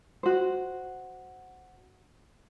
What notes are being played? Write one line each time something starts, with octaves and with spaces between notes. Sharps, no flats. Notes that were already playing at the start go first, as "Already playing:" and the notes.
F#4 C5